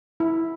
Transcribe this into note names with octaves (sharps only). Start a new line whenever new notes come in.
E4